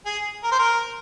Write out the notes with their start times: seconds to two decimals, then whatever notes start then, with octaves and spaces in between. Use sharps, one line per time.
0.06 G#4
0.44 A#4
0.52 C5
0.59 A#4